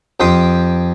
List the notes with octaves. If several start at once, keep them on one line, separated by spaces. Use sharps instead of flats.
F2 G4 G5 C6 D#6